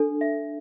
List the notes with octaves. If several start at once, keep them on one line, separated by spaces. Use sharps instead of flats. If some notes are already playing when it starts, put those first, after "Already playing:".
Already playing: D4 A4
E5